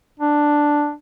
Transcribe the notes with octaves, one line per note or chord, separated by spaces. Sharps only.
D4